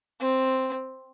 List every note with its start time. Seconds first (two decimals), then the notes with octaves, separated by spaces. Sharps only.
0.20 C4